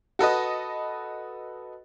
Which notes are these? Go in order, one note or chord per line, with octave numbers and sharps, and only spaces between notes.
F#4 A4 B4 D#5